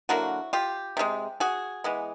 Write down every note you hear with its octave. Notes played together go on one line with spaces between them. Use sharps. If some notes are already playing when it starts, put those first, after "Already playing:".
D3 F#3 A#3 E4 F#4
F4 G4
C3 E3 G#3
F#4 G#4
E3 G#3 B3